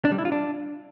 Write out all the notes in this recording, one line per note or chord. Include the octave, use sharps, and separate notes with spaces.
D4
G3
E4
F4
D4